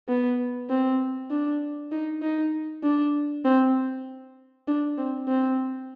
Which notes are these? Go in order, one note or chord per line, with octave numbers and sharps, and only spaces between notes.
B3
C4
D4
D#4
D#4
D4
C4
D4
C4
C4